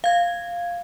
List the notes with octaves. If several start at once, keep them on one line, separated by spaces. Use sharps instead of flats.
F5 G#6